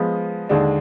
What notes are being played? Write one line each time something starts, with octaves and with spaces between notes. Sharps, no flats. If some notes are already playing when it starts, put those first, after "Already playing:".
Already playing: F3 G#3 B3
D#2 D3 G#3 D4